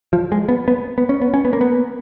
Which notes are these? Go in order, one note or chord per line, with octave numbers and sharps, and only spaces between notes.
F3
G#3
B3
B3
B3
C#4
B3
C#4
B3
A#3
B3